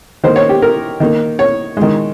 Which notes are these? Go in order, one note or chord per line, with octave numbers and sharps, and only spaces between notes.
D#3 A#3 C5
C#5
G4
A#4
D#3 A#3
C#5
G#3
D#3